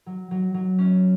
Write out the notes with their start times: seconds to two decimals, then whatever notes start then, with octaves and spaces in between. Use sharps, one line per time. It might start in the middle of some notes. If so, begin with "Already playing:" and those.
0.06 F#3
0.31 F#3
0.54 F#3
0.79 C#4